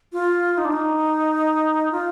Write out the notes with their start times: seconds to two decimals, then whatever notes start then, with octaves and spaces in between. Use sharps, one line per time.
0.13 F4
0.58 D#4
0.65 D4
0.72 D#4
1.92 F4